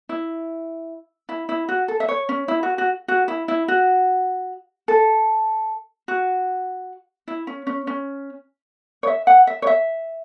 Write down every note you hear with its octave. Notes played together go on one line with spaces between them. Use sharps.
E4
E4
E4
F#4
A4
E5
C#5
C#4
E4
F#4
F#4
F#4
E4
E4
F#4
A4
F#4
E4
C#4
C#4
C#4
C#5
E5
F#5
E5
C#5
E5